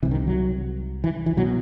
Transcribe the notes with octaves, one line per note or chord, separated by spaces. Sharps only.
C2 C3 E3
D#3
F#3
E3
E3
B2 F#3